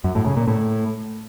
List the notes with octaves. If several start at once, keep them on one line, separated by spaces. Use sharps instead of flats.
F#2
A2
C#3
A#2
A2